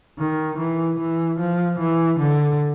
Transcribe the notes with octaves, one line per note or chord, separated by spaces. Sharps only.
D#3
E3
E3
F3
E3
D3